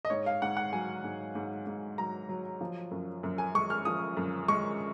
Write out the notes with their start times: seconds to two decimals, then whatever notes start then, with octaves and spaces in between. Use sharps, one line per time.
0.05 D#5
0.10 G#2 C#5
0.26 F5
0.42 G#2 F#5
0.57 F#5
0.73 F#3 G#5
1.04 G#2
1.35 G#2
1.67 G#2
1.98 F#3 A#5
2.29 F#3
2.61 F3
2.91 F#2
3.23 F#2
3.38 G#5
3.54 G#3 C#6
3.70 F6
3.85 F3 D#6
4.17 F#2
4.48 G#3 C#6